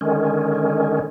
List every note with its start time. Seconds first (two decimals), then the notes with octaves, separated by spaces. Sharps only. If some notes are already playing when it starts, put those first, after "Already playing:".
0.01 D3 D#3 G#3 C#4